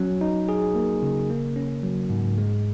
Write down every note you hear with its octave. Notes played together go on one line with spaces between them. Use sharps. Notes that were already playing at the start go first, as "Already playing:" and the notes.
Already playing: F#3 C#4
D#4
G#4
A#3
C#3
A#3
C#4
F#3
G#2
G#3